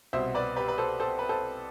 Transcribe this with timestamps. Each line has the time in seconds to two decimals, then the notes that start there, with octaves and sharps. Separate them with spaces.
0.13 C2 B2 C5 E5
0.34 B4 D5
0.56 G4 B4
0.68 B4
0.78 A4 C5
1.00 A4 C5
1.19 B4
1.29 A4 C5